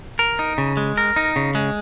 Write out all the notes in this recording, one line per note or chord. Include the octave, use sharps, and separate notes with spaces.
A#4
D#4
C#3
G#3
A#4
D#4
C#3
G#3